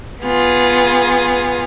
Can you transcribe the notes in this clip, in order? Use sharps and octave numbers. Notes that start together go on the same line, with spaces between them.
B3 F4 G#4